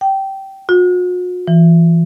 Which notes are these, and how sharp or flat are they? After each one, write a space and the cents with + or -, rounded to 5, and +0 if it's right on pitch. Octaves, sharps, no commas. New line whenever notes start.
G5 -15
F#4 -45
E3 +20